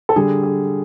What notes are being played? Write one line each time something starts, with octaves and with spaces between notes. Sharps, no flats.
A4
D3 G3 G#4
G#4